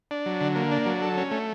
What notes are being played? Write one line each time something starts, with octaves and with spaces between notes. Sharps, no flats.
D4
F#3
D3
A#3
D4
F#3
A4
C#4
A3